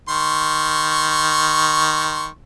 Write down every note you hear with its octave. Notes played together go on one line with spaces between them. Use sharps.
D#3 C6 C#6